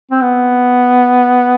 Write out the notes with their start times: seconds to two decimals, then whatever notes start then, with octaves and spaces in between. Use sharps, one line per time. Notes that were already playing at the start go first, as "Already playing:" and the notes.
0.11 C4
0.21 B3